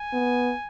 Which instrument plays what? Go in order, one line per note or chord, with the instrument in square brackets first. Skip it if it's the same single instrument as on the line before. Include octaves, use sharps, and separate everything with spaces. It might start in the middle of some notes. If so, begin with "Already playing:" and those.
Already playing: [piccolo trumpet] G#5
[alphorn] B3